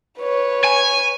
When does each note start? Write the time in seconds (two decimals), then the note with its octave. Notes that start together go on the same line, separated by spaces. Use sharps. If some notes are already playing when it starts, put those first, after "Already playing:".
0.20 B4 C#5
0.64 G#5